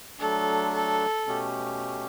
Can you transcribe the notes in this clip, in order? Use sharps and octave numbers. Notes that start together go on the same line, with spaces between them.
F#3 A3 D4 A4
A4
B2 A3 C#4 G4